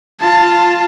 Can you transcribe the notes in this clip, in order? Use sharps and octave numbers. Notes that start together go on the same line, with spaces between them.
F4 A5